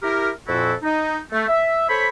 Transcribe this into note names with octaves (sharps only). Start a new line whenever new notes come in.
E4 G4 A#4
F2 A#2 E4 F#4 A4
D#4
A3
E5
A4 C5 C#5 B5